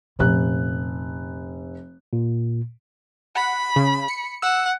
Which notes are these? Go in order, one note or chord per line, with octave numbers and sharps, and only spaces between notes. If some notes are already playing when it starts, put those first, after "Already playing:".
F1 A#2 C#4 F#6
A#2
F#5 B5
C#3
C#7
F#5 E6